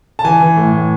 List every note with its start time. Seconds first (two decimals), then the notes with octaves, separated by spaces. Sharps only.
0.19 A5
0.24 E3 G#5
0.40 E3
0.56 A2
0.73 A2